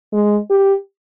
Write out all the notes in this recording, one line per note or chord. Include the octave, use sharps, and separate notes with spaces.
G#3
G4